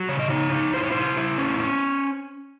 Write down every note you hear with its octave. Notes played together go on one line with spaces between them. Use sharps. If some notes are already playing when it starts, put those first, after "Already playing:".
Already playing: F#3
C#3 C#5
D#5
D#4 C#5
D#4
E4 C5
C#5
E4 C5
E4
C#4
C#4